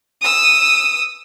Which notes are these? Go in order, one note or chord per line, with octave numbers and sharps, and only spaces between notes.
D#6 E6